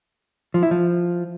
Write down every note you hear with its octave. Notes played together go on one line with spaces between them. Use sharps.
F3
E4
F3